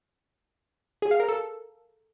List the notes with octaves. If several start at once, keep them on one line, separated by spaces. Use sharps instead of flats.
G#4
F5
A#4
A4